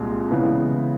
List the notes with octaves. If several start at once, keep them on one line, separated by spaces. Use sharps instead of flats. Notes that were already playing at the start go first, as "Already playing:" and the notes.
Already playing: C2 A#2 G#3
C#3 E3 G#3 B3 E4